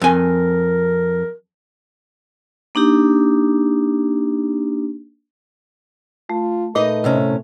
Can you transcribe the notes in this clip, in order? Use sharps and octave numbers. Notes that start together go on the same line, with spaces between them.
F2 A#4 G#5
A#3 D4 D#4 G4
A3 F4
A#2 A3 D#4 B4 D#5
A2 C3 C#4